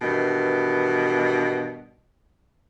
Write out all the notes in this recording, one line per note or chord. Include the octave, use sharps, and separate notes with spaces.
G2 B2 D#3 E3